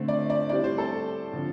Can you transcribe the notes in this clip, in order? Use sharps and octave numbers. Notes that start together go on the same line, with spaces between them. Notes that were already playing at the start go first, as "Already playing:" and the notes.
Already playing: D3 A3 C4
D5
D5
A2 G3 C4 D5
C5
A4
D3 F3 C4